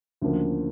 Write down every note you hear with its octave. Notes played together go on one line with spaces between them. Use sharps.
D2 C#3 F3 A#3